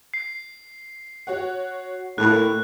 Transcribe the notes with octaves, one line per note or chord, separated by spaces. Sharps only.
C7
F#4 C#5 F#5
A2 A#3 F#6